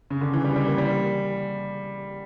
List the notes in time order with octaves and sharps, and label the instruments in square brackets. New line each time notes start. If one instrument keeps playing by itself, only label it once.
[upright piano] C#3
D3
E3
G3
G3
A#3
G3